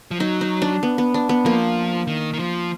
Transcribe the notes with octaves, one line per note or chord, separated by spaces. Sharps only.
F3
F#3 D#4
D#4
D4
B3
B3
D4
B3
F3 A#3
D#3
D#3
F3